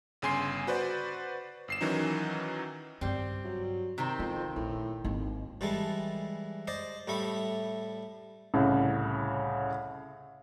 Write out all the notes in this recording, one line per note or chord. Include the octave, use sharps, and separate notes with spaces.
G1 C#3 G#5 C6 C7
F#4 B4 C5 D5
G1 C7 E7
D#3 E3 F#3 C#4 D#4
G2 C#3 G3 C4
F#3
C3 D#3 C4
F2 E4
A#1 A2
G#1 D#2
E3 G3 G#3 A4
C5 D5 D#5 C6
A2 G3 A3 E5 B5
C2 A2 C#3